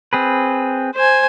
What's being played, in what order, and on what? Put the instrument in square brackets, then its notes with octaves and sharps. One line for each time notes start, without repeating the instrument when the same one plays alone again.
[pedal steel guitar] C4 G#4 B4
[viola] C5 G#5